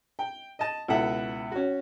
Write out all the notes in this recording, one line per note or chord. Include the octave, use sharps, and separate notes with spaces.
G5
D#5 A5
C#2 B2 E4 A4 E5 F#5
C#4 F#4